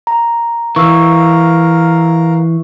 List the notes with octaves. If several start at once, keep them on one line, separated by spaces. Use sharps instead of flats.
A#5
E3 A#4 F5 C#6 E6